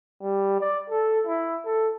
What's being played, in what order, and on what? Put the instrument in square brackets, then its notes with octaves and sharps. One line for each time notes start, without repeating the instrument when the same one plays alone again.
[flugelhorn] G3
D5
A4
E4
A4